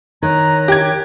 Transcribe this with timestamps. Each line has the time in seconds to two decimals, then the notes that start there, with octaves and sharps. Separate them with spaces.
0.22 D#3 C#5 A#5 F#6
0.68 G4 G#6